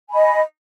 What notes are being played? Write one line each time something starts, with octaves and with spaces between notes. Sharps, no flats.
D#5 G#5 B5